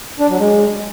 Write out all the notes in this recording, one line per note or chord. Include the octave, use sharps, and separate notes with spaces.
D4
F#3
G#3